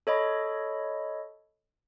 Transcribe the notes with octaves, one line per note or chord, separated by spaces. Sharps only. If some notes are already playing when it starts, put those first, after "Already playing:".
A4 C#5 D#5 B5